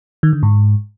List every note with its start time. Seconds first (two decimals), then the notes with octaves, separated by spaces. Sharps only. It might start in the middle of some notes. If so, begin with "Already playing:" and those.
0.23 D#3
0.33 D3
0.43 G#2